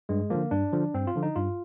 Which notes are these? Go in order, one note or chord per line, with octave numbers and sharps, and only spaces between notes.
G2 G#3
D3 F3 A#3
G2 D4
D3 F3
G2 C4
F4
D3 F3
D#4
G2 F4